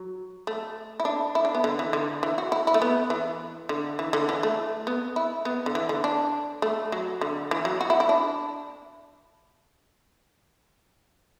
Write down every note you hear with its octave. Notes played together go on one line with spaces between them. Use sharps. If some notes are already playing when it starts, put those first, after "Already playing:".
Already playing: F#3
A3
E4
D4
E4
D4
B3
D3
E3
D3
E3
F#4
E4
E4
A3
B3
E3
D3
E3
D3
E3
A3
B3
E4
B3
D3
E3
D3
D4
A3
F#3
D3
E3
F#3
F#4
E4
E4
D4